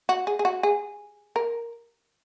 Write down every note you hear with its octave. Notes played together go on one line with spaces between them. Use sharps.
F#4
G#4
G#4
F#4
G#4
A#4